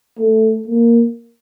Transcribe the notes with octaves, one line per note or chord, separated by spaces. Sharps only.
A3
A#3